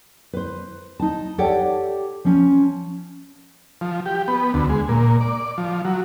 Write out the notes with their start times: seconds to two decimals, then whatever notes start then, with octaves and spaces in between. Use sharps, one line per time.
0.33 B4 C5
1.00 D#4 A5
1.38 G4 A4 C#5 D5 F#5 G5
2.25 F3 C#4
3.81 F3
4.06 G4
4.28 B3
4.54 D2
4.69 G#3
4.89 A#2
5.21 D5
5.58 F3
5.85 F#3